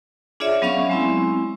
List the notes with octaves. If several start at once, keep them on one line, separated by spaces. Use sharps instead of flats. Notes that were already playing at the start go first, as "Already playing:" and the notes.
D4 F4 G#4 C#5 D5 E5
F#3 B3 C#4 F5 C#6
G#3 C4 E4